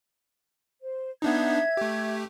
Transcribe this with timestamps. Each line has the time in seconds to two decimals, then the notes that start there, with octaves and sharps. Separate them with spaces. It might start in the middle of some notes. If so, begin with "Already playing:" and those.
0.82 C5
1.22 B3 D4 D#4 E5 G#6
1.77 A3 G4